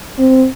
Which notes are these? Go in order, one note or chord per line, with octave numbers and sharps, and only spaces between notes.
C4